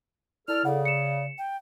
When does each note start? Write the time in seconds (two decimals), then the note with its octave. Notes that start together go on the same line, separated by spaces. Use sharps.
0.48 E4 A4 D5 F6
0.65 C#3 A4 D5 F#5
0.85 C#7 E7
1.38 G5